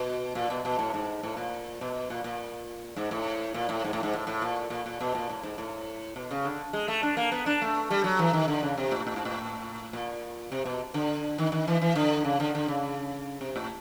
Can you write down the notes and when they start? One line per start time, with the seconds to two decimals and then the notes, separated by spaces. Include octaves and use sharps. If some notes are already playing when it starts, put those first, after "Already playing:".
Already playing: B2
0.35 A#2
0.50 B2
0.65 B2
0.79 A2
0.94 G#2
1.23 A2
1.37 A#2
1.81 B2
2.10 A#2
2.24 A#2
2.96 G#2
3.11 A2
3.54 A#2
3.69 A2
3.84 G#2
3.93 A2
4.03 G#2
4.13 A2
4.27 A2
4.42 A#2
4.70 A#2
4.86 A#2
5.00 B2
5.15 A#2
5.29 A2
5.43 G#2
5.58 A2
6.16 B2
6.31 C#3
6.45 D3
6.73 G#3
6.88 A3
7.03 D4
7.17 A#3
7.32 B3
7.46 D4
7.62 A3
7.91 G3
8.04 F#3
8.19 E3
8.33 D#3
8.48 D3
8.63 C#3
8.77 C3
8.91 A2
9.07 A2
9.16 G#2
9.25 A2
9.93 A#2
10.52 C3
10.65 B2
10.94 D3
11.38 D#3
11.52 D#3
11.68 E3
11.81 E3
11.95 D3
12.24 C#3
12.40 D3
12.55 D3
12.68 C#3
13.41 C3
13.56 A2